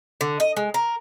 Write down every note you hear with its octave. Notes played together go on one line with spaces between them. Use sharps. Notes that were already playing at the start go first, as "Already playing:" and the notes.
D3
D#5
G#3
A#4